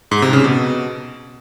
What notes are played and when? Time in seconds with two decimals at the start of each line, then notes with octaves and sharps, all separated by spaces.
0.11 G#2
0.22 C3
0.33 C#3
0.44 B2